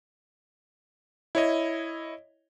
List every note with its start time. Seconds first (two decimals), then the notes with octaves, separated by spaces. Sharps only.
1.35 E4 C#5 D#5